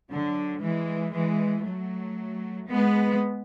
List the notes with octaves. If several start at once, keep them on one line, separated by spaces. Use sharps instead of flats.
D3 F#3
E3 G#3
E3 G#3
F#3 A3
G#3 B3